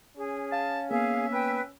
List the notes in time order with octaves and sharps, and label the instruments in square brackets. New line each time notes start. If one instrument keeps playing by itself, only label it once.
[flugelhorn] C#4 [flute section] G#4
[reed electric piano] F5 [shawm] A5
[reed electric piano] A#3 B3 [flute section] G#4 F5 [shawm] E5
[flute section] B4 G5